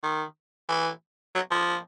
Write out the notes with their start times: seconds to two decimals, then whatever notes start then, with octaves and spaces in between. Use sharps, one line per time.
0.03 D#3
0.69 E3
1.35 F#3
1.51 F3